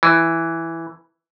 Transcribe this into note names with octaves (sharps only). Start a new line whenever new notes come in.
E3